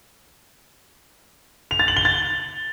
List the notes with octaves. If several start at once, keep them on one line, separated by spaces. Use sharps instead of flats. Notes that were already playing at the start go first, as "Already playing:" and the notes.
F7
A6
F#7
G7
A6